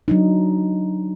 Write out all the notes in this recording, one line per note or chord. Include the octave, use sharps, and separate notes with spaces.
F#3 D4 D#4